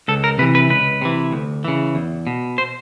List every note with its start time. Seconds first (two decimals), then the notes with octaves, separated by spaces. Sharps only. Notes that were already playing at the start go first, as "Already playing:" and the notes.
0.08 C#2 A4
0.24 A#4
0.39 C3 B4
0.42 E3
0.55 B4
0.70 C#2 B4
1.02 C3 E3
1.32 D2
1.65 C#3 E3
1.95 E2
2.27 B2
2.58 C5